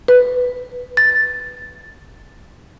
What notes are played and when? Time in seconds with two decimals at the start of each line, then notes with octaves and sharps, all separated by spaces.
0.08 B4
0.97 A6